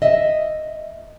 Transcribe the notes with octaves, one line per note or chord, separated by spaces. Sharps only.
D#5 E5